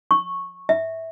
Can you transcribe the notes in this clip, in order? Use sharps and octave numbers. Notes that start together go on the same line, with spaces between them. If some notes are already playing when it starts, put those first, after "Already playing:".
C#6
E5